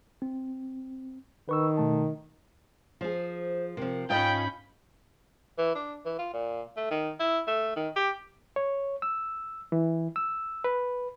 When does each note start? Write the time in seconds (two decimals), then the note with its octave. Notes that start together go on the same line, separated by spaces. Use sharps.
0.22 C4
1.49 D#3 B4 C#6 E6
1.77 B2 A3 A5
3.01 F3 G#4 C5
3.77 C3 F3 A#4
4.10 G#2 C#4 F4 D#5 G5 B5 G6
5.58 E3
5.75 D4
6.06 E3
6.19 F4
6.34 A#2
6.77 A3
6.91 D#3
7.20 E4
7.48 A3
7.76 D#3
7.96 G4
8.56 C#5
9.02 E6
9.72 E3
10.16 E6
10.64 B4